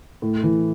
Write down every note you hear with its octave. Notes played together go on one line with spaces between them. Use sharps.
A2
E3